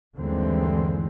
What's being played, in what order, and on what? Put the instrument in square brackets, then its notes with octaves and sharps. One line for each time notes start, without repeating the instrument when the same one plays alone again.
[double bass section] G1 D#2 D3 E3 G#3 C4